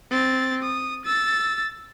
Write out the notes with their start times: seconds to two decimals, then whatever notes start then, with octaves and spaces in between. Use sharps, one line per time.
0.11 C4 A6
0.63 D#6
1.05 E6 A6